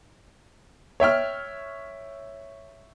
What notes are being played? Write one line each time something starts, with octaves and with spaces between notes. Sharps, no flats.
C#5 E5 G5 F6